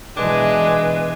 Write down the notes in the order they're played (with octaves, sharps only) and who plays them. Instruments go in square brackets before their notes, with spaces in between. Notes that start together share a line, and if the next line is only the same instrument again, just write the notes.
[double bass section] B2 E3 [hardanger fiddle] G#3 [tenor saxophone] D4 [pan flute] B4